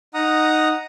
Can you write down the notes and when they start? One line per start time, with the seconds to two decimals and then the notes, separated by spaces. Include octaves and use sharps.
0.14 D#4 F#5 A#5 D#6